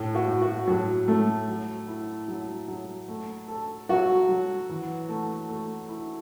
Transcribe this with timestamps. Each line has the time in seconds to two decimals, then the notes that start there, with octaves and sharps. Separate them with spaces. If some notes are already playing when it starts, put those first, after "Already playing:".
Already playing: A2
0.15 F#4
0.28 A2
0.41 F#4
0.67 A2 F#3
1.08 A3 A4
1.48 F#3
1.88 E4
2.28 F#3
2.68 F#3
3.08 A3
3.48 A4
3.89 F#3 F#4
4.29 F#3
4.70 E3
5.09 A3
5.49 A3
5.89 E4